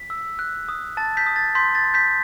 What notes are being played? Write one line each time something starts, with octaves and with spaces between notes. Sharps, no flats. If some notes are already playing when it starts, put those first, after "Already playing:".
Already playing: B6
E6
F#6
D#6
A5 A6
G6 B6
D#6
A6
C6 G6 B6
A6
C6
G6 B6